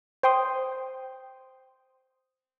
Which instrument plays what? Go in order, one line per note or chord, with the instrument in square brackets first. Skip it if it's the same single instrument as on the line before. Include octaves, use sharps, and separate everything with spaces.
[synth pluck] C5 G5 C6 D#6